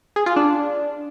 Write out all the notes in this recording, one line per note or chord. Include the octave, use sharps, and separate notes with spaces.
G#4
F4
D4